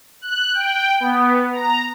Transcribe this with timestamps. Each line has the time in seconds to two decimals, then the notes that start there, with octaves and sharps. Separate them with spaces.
0.22 F#6
0.54 G5
1.00 B3
1.52 A#5